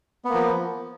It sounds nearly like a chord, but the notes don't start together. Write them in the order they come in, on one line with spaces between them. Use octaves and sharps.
B3 A#3 F3